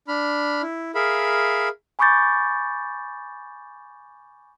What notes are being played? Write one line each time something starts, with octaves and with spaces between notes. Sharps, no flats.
D4 B5 F6
E4
G#4 A#4 E5 F5 B5
G#5 B5 C#6 D6 G6 A6